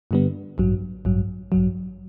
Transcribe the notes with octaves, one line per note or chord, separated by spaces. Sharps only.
G2 D3 G3 B3
A1 G2 F#3
A1 G2 F#3
A1 G2 F#3